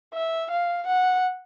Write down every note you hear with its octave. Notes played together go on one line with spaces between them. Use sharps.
E5
F5
F#5